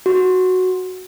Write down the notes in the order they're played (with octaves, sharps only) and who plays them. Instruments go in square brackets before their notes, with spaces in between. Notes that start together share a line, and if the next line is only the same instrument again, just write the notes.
[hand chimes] F#4